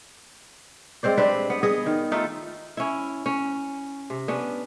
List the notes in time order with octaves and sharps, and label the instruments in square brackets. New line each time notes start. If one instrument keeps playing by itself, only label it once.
[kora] G#3 C4 C5 D5
C4 D4 G4 B4
B3
B3 G#4 D#5
D#3
A3 D#4 F4 A4
C#4 E4
C#4
C3
B3 C#4 D4